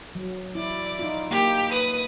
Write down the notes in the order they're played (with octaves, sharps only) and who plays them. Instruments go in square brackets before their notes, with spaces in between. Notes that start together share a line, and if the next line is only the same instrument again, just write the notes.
[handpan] F#3
[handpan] E4 [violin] D5
[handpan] D#4 F4
[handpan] A#3 [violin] G4
[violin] B4 D#6